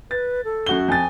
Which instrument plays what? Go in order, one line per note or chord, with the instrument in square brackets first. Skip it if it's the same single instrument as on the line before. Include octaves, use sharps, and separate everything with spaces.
[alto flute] B4 [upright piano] A6
[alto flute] A4
[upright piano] F#2 F#4 G7
[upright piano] F2 A6 [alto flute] G#5